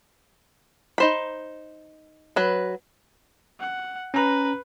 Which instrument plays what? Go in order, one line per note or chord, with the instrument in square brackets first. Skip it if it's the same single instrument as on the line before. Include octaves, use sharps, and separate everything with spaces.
[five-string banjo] D#4 C5 B5
F#3 B4
[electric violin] F#5
[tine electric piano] C#4 A#5 [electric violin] B4